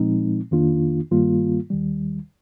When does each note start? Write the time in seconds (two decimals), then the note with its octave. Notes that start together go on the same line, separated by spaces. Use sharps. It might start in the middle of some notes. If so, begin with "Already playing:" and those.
Already playing: A#2 F3 G#3 C4 D#4
0.51 F2 D#3 A#3 D4 F4
1.11 G2 D#3 G3 A#3 F4
1.70 D#2 D#3 G3